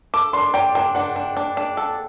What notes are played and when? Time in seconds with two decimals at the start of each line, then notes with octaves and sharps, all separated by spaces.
0.14 A4 D6
0.33 D4 C6
0.54 D5 G5
0.75 D4 G5
0.95 D4 F#5
1.16 D4
1.37 D4
1.57 D4
1.77 A4